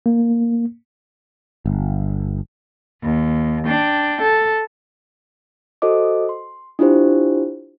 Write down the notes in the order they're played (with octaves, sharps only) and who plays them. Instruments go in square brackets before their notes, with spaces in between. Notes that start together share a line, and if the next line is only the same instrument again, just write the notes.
[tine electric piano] A#3
[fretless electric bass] G1
[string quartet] D#2
D4 G5
A4
[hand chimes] F#4 A4 C5 D#5 D6
C6
D4 E4 F4 G4 C5